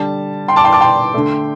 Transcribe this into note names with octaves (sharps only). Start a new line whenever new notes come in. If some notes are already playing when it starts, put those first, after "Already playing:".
Already playing: D3 G3 A5
G5 C6
A5 D6
G5 C6
A5 D6
G5 C6
D3 A3